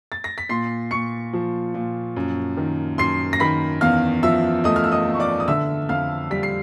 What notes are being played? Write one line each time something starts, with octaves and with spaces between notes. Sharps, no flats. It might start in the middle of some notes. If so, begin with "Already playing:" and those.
A6
A#6
B6
A#2 C6 C7
A#2 C#6 C#7
F3
A#2
F#2
D#3
F#2 C6 C7
A#6
D#3 B5 B6
E2 F5 F6
F3 E5 E6
A3 D#5 D#6
F6
E6
D#5 D#6
A3
C#6
D5 D6
D#6
D3 E5 E6
F2 F5 F6
G3 B6
C7